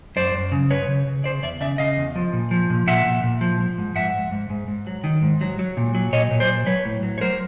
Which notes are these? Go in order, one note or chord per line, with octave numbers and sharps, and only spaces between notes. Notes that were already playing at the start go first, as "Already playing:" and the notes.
F#2 C5 D5
F#2
C#3
F#2 B4 C#5
C#3
C#3
C#3 C5 D5
E2 D5 E5
C#3 D5 E5
C#3 D#5 F5
E2
F3
A#2
F3
A#2
A#2 E5 F#5
A#2
A#2
F3
F3
G#2
G#2 E5 F#5
G#2
G#2
G#2
G#2
F#3
D#3
G#2
F#3
F#3
A#2
F#3
A#2 C#5 D#5
A#2
C5 D5
F#3
F#3 B4 C#5
A2
F#3
C#5
F#3 A#4 C5